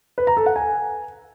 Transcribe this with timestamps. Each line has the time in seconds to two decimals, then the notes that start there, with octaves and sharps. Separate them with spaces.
0.18 B4
0.27 A#5
0.37 A4
0.46 F#5
0.56 G#5